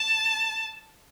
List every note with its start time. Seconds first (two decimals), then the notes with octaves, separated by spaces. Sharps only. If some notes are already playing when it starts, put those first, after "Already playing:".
Already playing: A5